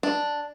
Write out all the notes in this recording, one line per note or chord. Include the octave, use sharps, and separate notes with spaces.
D4